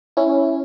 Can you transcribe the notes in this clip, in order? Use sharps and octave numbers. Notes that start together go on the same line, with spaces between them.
C#4 E4